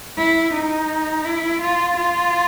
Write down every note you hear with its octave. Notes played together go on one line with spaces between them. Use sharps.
E4
D#4
E4
F4
F4